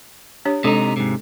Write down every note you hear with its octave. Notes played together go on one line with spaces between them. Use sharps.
D4 G4 C#5
C3 G#3 D4 D#4 A4
G#2 C3